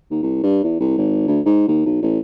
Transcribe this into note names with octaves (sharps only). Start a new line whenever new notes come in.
D#2
C2
G2
E2
C2
G#1
D2
G#2
D#2
B1
A1